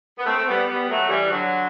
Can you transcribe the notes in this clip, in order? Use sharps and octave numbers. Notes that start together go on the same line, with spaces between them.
B3
A3 C4
A3
G3 B3
G3 B3
F#3 A3
E3 G3
D3 F#3